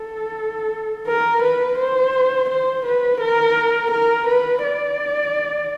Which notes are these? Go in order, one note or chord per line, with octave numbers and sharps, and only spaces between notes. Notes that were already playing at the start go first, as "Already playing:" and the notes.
Already playing: A4
A#4
B4
C5
C5
B4
A#4
A#4
B4
D5